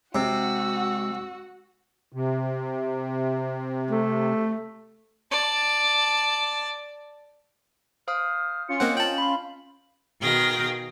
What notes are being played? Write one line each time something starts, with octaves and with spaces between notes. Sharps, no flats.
C3 G#3 F#4 F#5 E6
C3
A3
D5 A5
C5 F5 D#6 F6
C#4 F4 C#7
A#3 C4 C5 D#5 F#5
G5 A5 F#7
B5 C6
B2 D#3 G#4 F5 G5 A#6